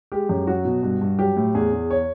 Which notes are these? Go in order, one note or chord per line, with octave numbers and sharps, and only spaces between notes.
G#3 G4
F#2
F#3 F#4
B2
G2
G2
F#3 G4
A2
E2 G#4
E2
C#5